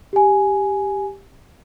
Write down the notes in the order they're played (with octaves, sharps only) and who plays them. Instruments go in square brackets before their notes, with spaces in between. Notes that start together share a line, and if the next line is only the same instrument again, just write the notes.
[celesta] G4 G#5